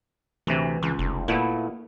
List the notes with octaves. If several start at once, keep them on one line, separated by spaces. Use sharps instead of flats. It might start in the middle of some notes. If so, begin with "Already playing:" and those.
D2 C3 E3
C#2 E3
F1
A#2 A3 B3 E4